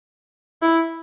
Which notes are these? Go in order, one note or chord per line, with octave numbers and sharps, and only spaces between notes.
E4